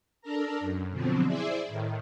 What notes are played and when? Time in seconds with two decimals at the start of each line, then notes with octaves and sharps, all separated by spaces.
0.21 D4 A4 A#4 A#5
0.60 F#2
0.91 B2 D3 F3 F#3 C4
1.27 E4 G#4 C5 D5 E5
1.68 A2 D#3